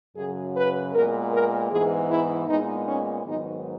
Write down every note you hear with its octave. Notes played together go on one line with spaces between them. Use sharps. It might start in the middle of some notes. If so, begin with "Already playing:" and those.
F#2 C#3 F#3 G#4
B4
A#2 G#3 B3 A#4
A#4
G#2 E3 B3 G#4
E4
A#2 G#3 B3 D#4
C#4
G#2 D#3 F#3 B3 D#4